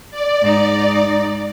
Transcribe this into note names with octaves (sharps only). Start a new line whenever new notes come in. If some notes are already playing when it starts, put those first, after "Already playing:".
D5
G#2 D#4